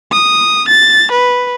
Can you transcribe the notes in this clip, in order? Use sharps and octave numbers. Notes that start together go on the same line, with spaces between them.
D#6
A6
B4